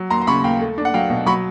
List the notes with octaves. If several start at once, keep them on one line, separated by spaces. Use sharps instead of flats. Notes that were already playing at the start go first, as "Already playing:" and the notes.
Already playing: F#3
D#2 A#5 C6
C6
C#3 B5 C#6
D#2 F5 G5
A3
D4
F#5
F#3 F5 G5
B2
F#3 B5 C#6